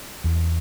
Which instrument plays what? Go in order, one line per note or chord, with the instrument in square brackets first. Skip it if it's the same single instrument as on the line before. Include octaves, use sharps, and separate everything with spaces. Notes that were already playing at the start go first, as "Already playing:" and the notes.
[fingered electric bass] E2